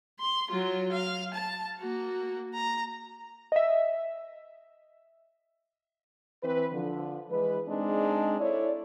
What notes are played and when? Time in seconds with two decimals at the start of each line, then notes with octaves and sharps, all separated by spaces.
0.20 C6
0.51 F#3 F4
0.92 F5
1.33 A5
1.79 A#3 F#4
2.54 A#5
3.52 D#5 E5
6.43 E3 C4 B4
6.72 D3 F3
7.31 E3 G#3 B4
7.68 G#3 C4 D4 D#4 G#4
8.40 E4 A4 C#5 D5